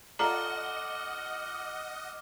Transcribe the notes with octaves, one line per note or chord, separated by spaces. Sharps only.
F4 A4 D5 D#5 F#5 A#5 D6 F6